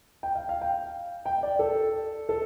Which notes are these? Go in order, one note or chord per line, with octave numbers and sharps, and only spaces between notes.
G5
F5
F5
G5
G5
D5
A4
A4